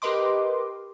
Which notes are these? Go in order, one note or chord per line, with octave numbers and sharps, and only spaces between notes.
G4 A#4 B4 D#5 C6 D6